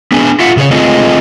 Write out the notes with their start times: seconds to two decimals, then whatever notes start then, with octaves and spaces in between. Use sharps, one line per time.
0.12 B3 D4 G#4 G#5
0.40 F4 E5 F#5
0.57 C#3 G#4 B4 C#5
0.71 A3 C4 F4 G#4 A4 D#5